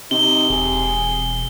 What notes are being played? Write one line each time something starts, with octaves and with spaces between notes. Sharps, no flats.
C3 D#4 G7
E1 G#4